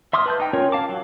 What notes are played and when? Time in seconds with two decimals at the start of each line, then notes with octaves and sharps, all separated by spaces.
0.13 E5 C6 D6 D#6 F6
0.26 B4 A5 G6
0.40 D#4 G5
0.53 C#4 F4 A#4 C#5
0.72 F5 A5 D6
0.89 F#3